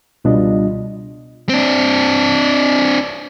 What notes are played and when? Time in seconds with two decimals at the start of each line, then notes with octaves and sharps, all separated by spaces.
0.24 C#2 B2 G3 D4 F4 D#5
1.49 C4 D4